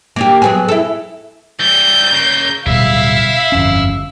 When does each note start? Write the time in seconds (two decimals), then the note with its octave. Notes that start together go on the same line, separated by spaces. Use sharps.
0.16 A#3 D4 G4
0.42 F#3 B3 G#4
0.68 E4 A4
1.60 E3 G3 G6
2.12 C#3 A#3
2.66 D1 B2 G3 E4 E5 F5
3.52 G1 F2 C#4